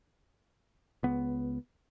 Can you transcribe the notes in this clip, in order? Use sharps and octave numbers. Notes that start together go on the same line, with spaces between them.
C#2 B3